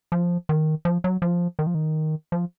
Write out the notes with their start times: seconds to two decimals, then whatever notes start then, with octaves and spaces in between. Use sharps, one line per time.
0.12 F3
0.49 D#3
0.85 F3
1.04 F#3
1.22 F3
1.59 D#3
1.67 F3
1.75 D#3
2.32 F3